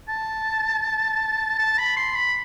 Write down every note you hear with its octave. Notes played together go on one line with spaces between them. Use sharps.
A5
A5
B5
C6
B5